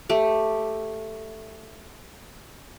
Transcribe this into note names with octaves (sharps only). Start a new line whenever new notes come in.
A3 G4